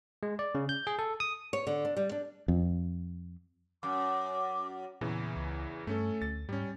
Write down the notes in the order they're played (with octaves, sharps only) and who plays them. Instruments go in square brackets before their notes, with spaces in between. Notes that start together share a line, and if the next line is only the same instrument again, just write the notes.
[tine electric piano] G#3
D5
C#3
G6
G#4
A4
D#6
[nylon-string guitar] C#5
D3
D4
G3
D4
[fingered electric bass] F2
[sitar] F#2 [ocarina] D6
[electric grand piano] E2 C#3 E3 [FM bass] A#2
[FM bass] C#2
[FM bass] G2 [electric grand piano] A3 C#4 A4
[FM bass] D2 [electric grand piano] A6
[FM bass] G#2 [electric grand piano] G3 C#4